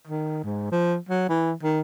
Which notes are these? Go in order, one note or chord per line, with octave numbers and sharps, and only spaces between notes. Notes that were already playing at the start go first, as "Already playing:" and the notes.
D#3
G#2
F3
F#3
E3
D#3